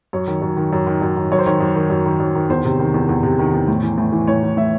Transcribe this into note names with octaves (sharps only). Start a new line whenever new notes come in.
F#2 C#5
D#3
F#2
D#3
F#2
D#3
F#2
D#3
F#2 C#5
C5
D#3 C#5
F#2
D#3
F#2
D#3
F#2
D#3
E2 C5
C3
D#3
E2
E2
C3
D#3
E2
A2
E3
A2
E3
A2 C#5
E3
A2 E5